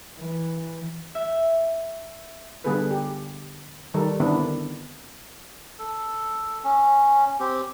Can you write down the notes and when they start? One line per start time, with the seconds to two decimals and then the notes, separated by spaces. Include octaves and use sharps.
0.17 E3
1.15 E5
2.64 D3 G3 B3 G#4 A4 B4
2.91 G4
3.94 D#3 G3 A4 A#4
4.20 D3 D#3 B3 C4 D4 E4
5.79 A4
6.64 C#4
7.40 C4 G4